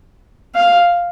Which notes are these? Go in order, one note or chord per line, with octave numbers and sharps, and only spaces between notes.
F5